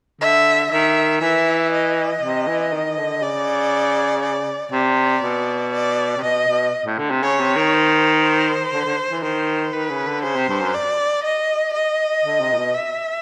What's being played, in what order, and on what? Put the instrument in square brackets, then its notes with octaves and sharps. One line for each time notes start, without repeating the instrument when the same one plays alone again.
[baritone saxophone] D3 [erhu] E5
[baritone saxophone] D#3 [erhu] E5
[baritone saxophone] E3 [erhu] E5
[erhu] D#5
[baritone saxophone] C3
E3
D#3
D3
[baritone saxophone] C#3 [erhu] D5
[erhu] D5
[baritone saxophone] C3 [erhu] D5
[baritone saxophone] B2
[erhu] D5
[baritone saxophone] C3
[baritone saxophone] B2 [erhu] D#5
[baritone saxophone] B2
A2
D3
C3
[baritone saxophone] C#3 [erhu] C#5
[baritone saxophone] C3
D#3
[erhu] C5
C5
[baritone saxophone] D3
D3
E3
[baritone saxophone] D#3 [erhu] C5
[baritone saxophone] D#3 [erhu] B4
[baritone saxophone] C#3
D3
[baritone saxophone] C#3 [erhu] C5
[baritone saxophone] C3
G2
F#2
[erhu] D5
D#5
D#5
[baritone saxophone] D3
C3
A#2
B2
[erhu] E5